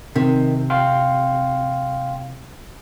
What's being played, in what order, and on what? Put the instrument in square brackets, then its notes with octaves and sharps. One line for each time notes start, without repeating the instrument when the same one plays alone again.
[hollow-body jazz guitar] C3 [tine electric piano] D#3
[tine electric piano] F5 G5 C6